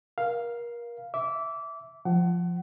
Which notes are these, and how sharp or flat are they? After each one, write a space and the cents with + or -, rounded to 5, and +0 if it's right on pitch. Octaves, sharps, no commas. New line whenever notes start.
A#4 +30 F5 +0
E5 +0 D6 -25
F3 +0 F#5 +25